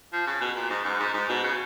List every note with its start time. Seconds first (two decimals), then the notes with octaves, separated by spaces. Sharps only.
0.13 F3
0.27 C#3
0.41 B2
0.56 A#2
0.70 G#2
0.85 F#2
1.00 G#2
1.14 G#2
1.29 B2
1.43 C#3